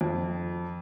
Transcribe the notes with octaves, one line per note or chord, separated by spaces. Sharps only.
F2